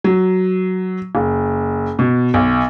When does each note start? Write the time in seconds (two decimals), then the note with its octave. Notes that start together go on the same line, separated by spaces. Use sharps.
0.04 F#3
1.15 F#1
1.99 B2
2.34 B1